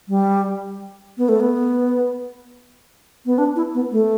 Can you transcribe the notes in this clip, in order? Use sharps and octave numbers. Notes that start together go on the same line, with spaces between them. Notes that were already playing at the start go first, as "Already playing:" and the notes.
G3
B3
A3
B3
B3
D4
E4
B3
A3